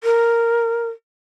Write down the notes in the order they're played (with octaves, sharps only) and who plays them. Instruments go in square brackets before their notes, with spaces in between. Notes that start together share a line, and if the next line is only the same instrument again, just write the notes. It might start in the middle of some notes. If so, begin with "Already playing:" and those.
[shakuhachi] A#4